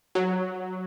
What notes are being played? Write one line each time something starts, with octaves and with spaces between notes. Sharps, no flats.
F#3